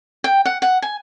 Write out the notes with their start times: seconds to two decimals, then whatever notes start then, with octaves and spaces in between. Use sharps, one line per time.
0.24 G5
0.46 F#5
0.62 F#5
0.82 G#5